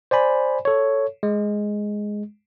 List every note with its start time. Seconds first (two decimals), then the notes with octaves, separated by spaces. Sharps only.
0.11 C5 D5 G#5 B5
0.65 A4 C#5
1.23 G#3